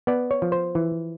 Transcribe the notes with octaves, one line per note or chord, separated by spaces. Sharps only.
B3 D5
C#5
F3
C5
E3